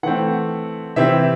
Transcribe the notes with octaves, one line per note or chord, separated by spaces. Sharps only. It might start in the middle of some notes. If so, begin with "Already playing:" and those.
E3 A3 C4 F#5
C3 E3 C4 E5